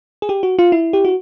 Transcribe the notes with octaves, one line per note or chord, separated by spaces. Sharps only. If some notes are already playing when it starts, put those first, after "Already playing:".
G#4
G4
F#4
F4
E4
G4
F#4